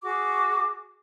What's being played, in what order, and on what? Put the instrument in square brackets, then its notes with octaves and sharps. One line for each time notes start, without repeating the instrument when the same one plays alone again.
[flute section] F#4 G#4 D6